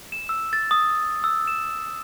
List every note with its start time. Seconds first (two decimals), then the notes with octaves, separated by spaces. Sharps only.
0.12 E7
0.29 E6
0.53 A6
0.71 D#6
1.24 E6
1.47 E7